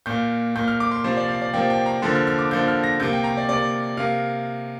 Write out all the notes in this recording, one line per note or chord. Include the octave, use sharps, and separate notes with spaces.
A#2 A#3 G6
A#2 A#3 G6
F6
D6
C6
C3 F3 A#3 C5
D5
F5
D5
C3 F3 A#3 G5
G5
A#5
D3 F3 A#3 C6
F6
F6
D6
D3 F3 A#3 G6
F6
A#6
C3 A#3 G6
G5
A#5
D5
C3 A#3 D5
C3 A#3 F5